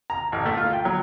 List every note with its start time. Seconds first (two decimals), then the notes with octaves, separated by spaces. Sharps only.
0.10 A#5
0.32 A1
0.46 A3
0.57 F4
0.73 G5
0.85 F#3